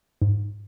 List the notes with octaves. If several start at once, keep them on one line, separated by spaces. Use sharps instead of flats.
G#2